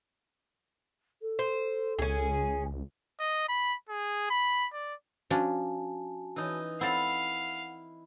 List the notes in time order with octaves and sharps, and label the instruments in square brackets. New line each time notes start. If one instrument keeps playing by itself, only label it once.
[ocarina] A4
[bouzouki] C5
[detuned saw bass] C#2 [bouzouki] C#4 G#4
[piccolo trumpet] D#5
B5
G#4
B5
D5
[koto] F3 C#4 D4 [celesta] F#4 G#5 A5
[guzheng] E3 D#4
[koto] C4 A4 [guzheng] E4 [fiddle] F5 [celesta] F#5